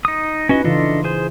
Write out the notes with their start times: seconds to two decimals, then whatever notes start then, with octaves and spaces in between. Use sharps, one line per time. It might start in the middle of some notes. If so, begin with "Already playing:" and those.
0.05 D#4 D#6
0.49 C#4 D#4 E4 F#4 B4 D#5
0.65 C#3 E3 D4 F4 A4 D#5
0.79 E4
1.04 G#4 C5